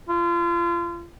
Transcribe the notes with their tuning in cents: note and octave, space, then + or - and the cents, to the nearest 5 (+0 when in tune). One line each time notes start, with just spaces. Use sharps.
F4 -35